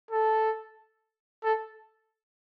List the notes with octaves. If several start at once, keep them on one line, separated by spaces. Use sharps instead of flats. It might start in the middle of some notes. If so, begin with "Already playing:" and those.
A4
A4